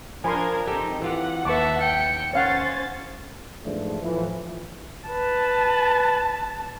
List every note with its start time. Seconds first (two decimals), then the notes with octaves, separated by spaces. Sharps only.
0.24 F3 D4 A#4 G#5 B5 C6 G#6
0.67 C4 D#4 G4 A4 G5
1.02 E3 F4 G4 F#5
1.45 D#2 B4 E5 A5 C#6 D6
1.82 G5 C#7
2.34 C#4 C5 C#5 F5 F#5 A6
3.64 E2 G#2 E3 F3 A3 D4
4.03 A2 E3 F3
5.09 B4 A5